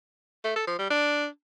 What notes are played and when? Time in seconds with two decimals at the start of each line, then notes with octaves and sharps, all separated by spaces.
0.44 A3
0.56 A4
0.67 F3
0.79 G3
0.90 D4